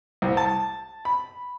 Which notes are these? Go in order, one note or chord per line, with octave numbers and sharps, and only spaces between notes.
C2
A5
B5